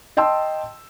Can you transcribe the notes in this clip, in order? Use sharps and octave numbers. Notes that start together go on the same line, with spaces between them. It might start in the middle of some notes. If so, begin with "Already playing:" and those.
D#5 G5 A5 C6 E6